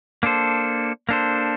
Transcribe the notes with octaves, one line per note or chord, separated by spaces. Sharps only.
A#3 D4 A4 C5
A#3 D4 A4 C5